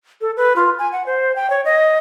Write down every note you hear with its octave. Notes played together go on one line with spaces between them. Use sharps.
A4
B4
F4
G#5
F#5
C5
G5
C#5
D#5